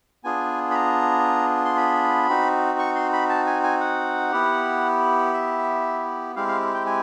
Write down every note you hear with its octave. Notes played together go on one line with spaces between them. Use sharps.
B3 D4 F4 G#4 G#5
B5
A#5
C6
B5
C4 D#4 F#4
C#6
C6
B5
A5
G#5
G#5
F#5
B3 E4 G4
E5
G#3 C4 E4 G4 F5
F5
G5
G#5